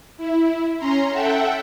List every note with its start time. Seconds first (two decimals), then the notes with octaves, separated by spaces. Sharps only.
0.17 E4
0.79 C#4 A#5 C6
1.10 A4 E5 F#5 G5